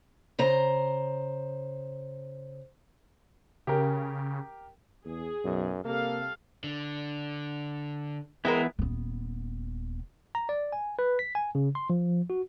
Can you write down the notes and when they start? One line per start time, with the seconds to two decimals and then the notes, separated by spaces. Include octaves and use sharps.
0.39 C#3 C5 A#5
3.67 C#3 G4 A#4
5.05 E2 G#4
5.45 B1 F#2
5.84 C3 G3 A#3 A4 F5
6.64 D3
8.45 E3 G#3 B3 C4 E4 A#4
8.79 D#1 B3
10.35 A#5
10.49 D5
10.72 G#5
10.99 B4
11.19 B6
11.35 G#5
11.55 C#3
11.75 C6
11.90 F3
12.30 F#4